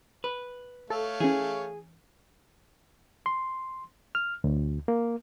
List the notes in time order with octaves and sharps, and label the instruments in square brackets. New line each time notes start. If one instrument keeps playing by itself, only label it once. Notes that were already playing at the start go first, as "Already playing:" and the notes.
[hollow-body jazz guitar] B4
[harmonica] A3 C#5 F5 [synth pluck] A4
[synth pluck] E3 C#4 [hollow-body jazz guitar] G#4
[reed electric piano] C6
F6
D2
A#3